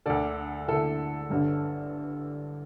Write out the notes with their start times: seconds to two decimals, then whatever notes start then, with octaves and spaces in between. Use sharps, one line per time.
0.06 D2 D3 A4 D5
0.68 D2 D3 E4 A4
1.30 G1 G2 D3